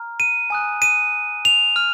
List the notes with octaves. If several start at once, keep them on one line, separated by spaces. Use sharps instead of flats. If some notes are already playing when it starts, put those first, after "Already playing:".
Already playing: A#5 F6
D#7
G#5 D#6 F#6
D#7
F7
F6